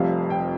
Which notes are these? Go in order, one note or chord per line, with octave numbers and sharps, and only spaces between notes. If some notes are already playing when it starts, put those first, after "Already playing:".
Already playing: F1 F2 C3 G3 F5
G5